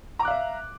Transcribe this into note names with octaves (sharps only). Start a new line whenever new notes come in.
E5 F5 A#5 D6 F#6